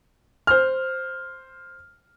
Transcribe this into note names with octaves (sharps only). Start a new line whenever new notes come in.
C5 F6